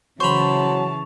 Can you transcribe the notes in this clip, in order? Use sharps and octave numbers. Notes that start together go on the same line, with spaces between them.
C#3 E3 F#3 C5 A5 B5 C#6 F7